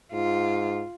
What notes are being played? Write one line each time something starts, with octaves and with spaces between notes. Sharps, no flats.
G#2 F4